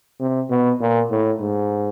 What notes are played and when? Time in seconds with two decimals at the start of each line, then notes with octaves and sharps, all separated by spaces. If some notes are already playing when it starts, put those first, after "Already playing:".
0.20 C3
0.50 B2
0.81 A#2
1.11 A2
1.41 G#2